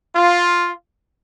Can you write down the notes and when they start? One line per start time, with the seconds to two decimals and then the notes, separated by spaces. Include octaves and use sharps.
0.16 F4